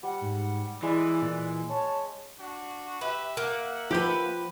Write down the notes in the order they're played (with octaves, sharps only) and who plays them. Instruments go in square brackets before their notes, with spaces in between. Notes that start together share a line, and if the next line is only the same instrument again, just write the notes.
[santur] G3 [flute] F#5
[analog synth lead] G#2
[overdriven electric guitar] E3 [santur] G#3 [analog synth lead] E4 [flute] D5
[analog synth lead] A#2
[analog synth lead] C#5 [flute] A5
[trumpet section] D4 F#4
[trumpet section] G4 E5 [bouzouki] B4
[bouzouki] A#3 [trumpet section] E5 F#5
[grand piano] F3 G6 [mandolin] G4 B4